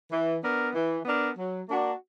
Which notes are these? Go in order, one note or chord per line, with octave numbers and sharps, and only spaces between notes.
E3
B3 D4 A#4
E3
B3 D4 A#4
F#3
A#3 D4 F#4